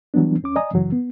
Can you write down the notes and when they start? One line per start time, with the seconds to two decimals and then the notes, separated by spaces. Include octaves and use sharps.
0.14 E3 F#3 G3 B3 D4
0.43 D#2 C#4 D6
0.56 D5 D#5 G#5 A#5 D#6
0.73 F#2 C#3 E3 F#3
0.92 B3